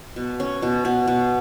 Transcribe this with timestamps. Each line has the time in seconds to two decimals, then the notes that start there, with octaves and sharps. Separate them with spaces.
0.16 B2
0.40 C#4
0.62 B2
0.85 B2 F#5
1.07 B2